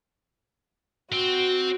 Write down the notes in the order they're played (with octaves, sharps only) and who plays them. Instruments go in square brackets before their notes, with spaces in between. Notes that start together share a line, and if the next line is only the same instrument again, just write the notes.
[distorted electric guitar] C4 [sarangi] F#4